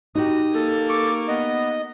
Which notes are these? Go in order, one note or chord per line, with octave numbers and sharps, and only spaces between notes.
D#4 F#4 G4 D#6
A#3 A4
C#6 D6
B3 D#5